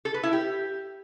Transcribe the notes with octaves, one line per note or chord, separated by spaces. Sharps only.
A4
B4
E4
G4